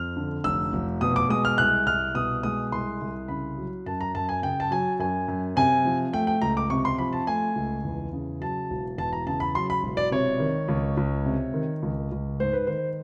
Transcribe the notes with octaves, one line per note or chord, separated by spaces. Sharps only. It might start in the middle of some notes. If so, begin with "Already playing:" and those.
Already playing: F2 F6
D3
F1 E6
F1
B2 D#6
D6
G#3 D#6
F6
C2 F#6
C2 F6
B2 D#6
G#3 D#6
C2 C6
C2
C#3 B5
F#3
F#2 A5
A#5
F#2 A5
G#5
C#3 G5
A5
F#3 G#5
F#2 G#5
F#2
C3 G#5
F3
A3 G5
G5
C#2 A#5
D6
C3 C#6
C6
F3 B5
A5
A3 G#5
C#2
E2
C#3
F#3 A5
E1
E2 A5
A#5
C#3 A5
B5
F#3 C6
B5
E1
D5
C3 C#5
D#3
C#2
C#2
C3
D#3
C#2
C#2
G#2 C5
B4
D#3 C5